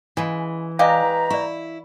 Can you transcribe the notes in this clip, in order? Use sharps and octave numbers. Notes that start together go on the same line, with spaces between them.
C#3 E3 G#3
G#3 G4 B4 D5 D#5 F5 A#5
E4 D5 C#6